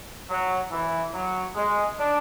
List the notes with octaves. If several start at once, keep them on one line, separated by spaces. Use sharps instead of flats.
F#3
E3
F#3
G#3
D4